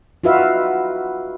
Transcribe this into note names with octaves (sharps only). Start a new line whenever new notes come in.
D#4 F4 F#4 B4 E5 F5